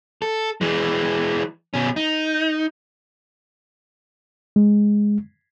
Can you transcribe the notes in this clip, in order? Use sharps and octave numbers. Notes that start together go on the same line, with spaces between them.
A4
E3 G#3
B2 C#4
D#4
G#3